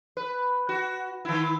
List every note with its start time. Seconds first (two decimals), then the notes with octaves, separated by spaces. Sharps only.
0.17 B4
0.69 F#4
1.25 D#3 E4